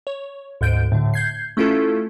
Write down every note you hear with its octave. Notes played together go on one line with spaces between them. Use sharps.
C#5
D2 G#2 G6 D7
A2 D3
G6 G#6 C7
A3 C#4 E4 F4 A4